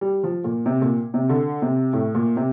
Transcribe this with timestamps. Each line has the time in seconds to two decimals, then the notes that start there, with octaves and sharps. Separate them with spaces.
0.01 G3
0.24 F3
0.44 A#2
0.66 C3
0.82 A#2
1.14 C3
1.29 D3
1.62 C3
1.93 A2
2.15 A#2
2.36 C3